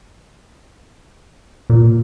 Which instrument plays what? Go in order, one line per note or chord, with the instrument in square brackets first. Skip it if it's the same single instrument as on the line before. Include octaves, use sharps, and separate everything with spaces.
[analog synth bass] A#2